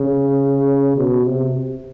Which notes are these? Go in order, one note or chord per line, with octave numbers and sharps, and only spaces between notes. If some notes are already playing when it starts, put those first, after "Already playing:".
Already playing: C#3
B2
C3